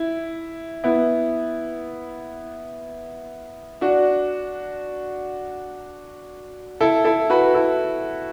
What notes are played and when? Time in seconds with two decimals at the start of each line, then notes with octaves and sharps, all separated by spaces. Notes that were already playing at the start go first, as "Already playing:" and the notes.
Already playing: E4
0.84 B3 E4
3.81 D4 F#4
6.81 E4 A4
7.05 E4 A4
7.30 F#4 B4
7.54 E4 A4